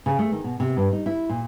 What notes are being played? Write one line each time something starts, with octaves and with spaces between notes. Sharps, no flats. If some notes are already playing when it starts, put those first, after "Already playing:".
C#3
A3
D#3
B2
C3
G2
D#4
E4
A#2